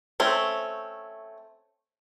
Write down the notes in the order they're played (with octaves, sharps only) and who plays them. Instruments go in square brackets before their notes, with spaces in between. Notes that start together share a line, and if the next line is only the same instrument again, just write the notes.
[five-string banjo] A3 C4 C#4